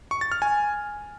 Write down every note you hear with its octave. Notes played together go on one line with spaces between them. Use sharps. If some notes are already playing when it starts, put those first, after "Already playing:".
C#6
A6
F6
G#5